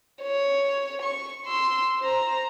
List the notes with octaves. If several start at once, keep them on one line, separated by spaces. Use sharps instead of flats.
C#5
C#6
C6 E6
C5 A#5